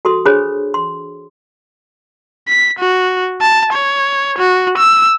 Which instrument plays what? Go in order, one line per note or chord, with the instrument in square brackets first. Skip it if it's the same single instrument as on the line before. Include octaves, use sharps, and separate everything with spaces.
[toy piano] F#4 A4 C6 D#6
D4 G#4 C5 C#5 B5
C6
[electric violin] B6
F#4
A5
C#5
F#4
E6